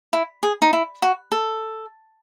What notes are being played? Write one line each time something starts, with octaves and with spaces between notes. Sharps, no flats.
E4
G#4
D#4
E4
F#4
A4